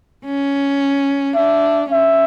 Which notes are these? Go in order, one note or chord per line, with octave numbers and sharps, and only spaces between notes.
C#4
D4 E5
C#4 E5